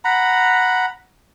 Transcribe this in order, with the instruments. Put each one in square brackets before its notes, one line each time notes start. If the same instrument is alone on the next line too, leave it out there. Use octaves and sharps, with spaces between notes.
[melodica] F#5 A#5 B5